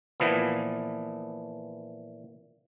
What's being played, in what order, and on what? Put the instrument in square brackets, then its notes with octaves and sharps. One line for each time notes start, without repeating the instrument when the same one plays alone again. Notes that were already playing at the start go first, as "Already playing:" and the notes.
[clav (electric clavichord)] A#2 E3 F3 B3